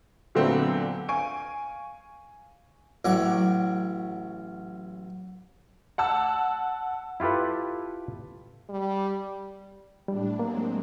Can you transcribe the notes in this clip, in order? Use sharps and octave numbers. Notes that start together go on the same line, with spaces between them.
A#2 D3 F#3 A3 B3 C4
F5 G#5 C#6 D7
A1 F#3 D6
F#5 A5 E6
E4 F4 G4 A4 B4
G3
A2 G3 D4
F#3 G#3 A#3 C4